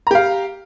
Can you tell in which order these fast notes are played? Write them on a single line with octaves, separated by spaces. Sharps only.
A#5 G4 F5